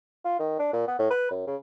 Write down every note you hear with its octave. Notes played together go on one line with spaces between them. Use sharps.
F4
D#3
D4
A#2
B3
A2
B4
F#2
C#3